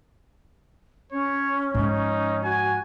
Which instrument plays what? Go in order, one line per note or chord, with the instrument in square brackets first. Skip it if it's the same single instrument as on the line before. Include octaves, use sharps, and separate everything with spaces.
[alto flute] C#4 [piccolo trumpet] C#5
[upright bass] G#2 F3 [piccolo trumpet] D#4
[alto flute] F#4 [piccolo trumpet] G#5